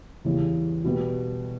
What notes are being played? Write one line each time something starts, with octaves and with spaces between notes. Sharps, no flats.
E2 C#3 E3 G3
B2 G3 B3